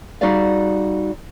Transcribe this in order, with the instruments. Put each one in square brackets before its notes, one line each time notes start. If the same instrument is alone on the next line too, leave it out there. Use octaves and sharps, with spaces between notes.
[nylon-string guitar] G3 D#4 F#4 G#4 D5 F5